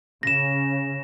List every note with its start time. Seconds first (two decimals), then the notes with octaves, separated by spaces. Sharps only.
0.23 C#3 A#6 E7